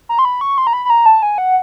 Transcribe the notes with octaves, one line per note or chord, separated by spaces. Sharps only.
A#5
C6
B5
C#6
C6
A#5
B5
B5
A#5
A5
G#5
F#5